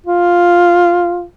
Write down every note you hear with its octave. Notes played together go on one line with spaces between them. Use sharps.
F4